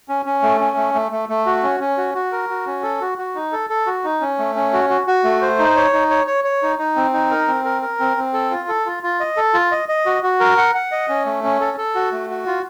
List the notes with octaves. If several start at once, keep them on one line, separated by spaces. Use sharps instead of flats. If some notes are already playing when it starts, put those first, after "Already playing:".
C#4
C#4
A3
C#4
A3
A3
A3
A3
F#4
C#4
C#4
F#4
F#4
A#4
F#4
C#4
A4
F#4
F#4
D#4
A4
A4
F#4
D#4
C#4
A3
C#4
F#4
F#4
F#4
A3
C5
D#4
C#5
D#4
C#5
C#5
C#5
D#4
D#4
C4
D#4
A#4
C4
A#4
A#4
C4
C4
A4
F4
A4
F4
F4
D#5
A4
F4
D#5
D#5
F#4
F#4
A#4
F#5
F#5
D#5
C#4
A3
C#4
A4
A4
F#4
A3
F#4
F4